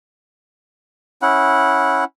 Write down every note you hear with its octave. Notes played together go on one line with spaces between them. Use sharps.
C#4 E4 F#5